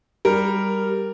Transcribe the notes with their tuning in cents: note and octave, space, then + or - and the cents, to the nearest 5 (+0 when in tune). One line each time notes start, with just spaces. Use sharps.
G3 +0 A#4 -5